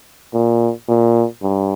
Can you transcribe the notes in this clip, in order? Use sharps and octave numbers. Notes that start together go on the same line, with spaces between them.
A#2
A#2
G2